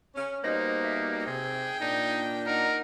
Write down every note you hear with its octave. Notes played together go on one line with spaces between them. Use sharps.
C#4
B2 G3 A#3 D#4 C5 D#5 A#6
E5
C3 G#4 G5
A#2 D4 D#4
D#4 A#4 F#5